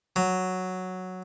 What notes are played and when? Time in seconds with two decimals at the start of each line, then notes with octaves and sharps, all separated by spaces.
0.16 F#3